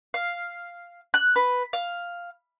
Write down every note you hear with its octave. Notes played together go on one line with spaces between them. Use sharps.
F5
F#6
B4
F5